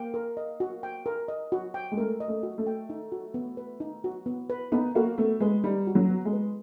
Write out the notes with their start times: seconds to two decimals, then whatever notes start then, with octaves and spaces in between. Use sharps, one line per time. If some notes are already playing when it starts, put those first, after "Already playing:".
Already playing: A#3 G5
0.14 A#4
0.37 D#5
0.60 F#4
0.83 G5
1.06 A#4
1.28 D#5
1.52 F#4
1.74 G5
1.92 G#3
1.98 A3 A#4
2.20 D#5
2.28 A3
2.43 F#4
2.58 A3
2.67 G5
2.90 D#4
3.12 F#4
3.34 B3
3.57 B4
3.80 D#4
4.04 F#4
4.26 B3
4.50 B4
4.72 B3 D#4
4.95 A#3 F#4
5.18 A3 B3
5.40 G#3 B4
5.64 G3 D#4
5.87 F#4
5.95 F#3
6.10 B3
6.25 G#3
6.33 B4